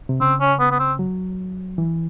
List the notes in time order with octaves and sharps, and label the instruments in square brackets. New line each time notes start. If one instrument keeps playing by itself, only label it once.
[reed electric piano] C3
[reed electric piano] C#3 [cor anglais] C4
[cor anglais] C#4
B3
B3
C4
[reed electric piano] F#3
E3